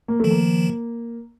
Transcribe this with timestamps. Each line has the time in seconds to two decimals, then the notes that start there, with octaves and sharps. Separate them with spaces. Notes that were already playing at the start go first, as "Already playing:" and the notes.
0.08 A#3
0.20 D#3 F3 A3
0.30 A#3